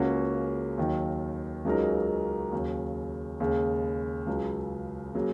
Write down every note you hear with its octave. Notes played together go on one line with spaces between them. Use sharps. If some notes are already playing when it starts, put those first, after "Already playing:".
Already playing: C#2 C#3 A#3 C#4 F#4
D#2 D#3 F#3
C#2 C#3 F#3 D#4 A#4
D#2 C#3 F#3
D#2 C#3 G#3
C#2 C#3 F#3
C#3 F#3 A#3